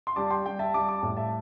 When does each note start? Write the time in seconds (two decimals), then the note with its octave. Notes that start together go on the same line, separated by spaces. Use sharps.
0.07 C6
0.16 G3 A5 D6
0.30 G5 C6
0.46 G3 G5
0.59 E5 A5
0.74 G3 A5 D6
0.88 A5 D6
1.03 A2
1.17 E5 A5